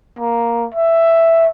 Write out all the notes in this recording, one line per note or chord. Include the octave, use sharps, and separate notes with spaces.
A#3
E5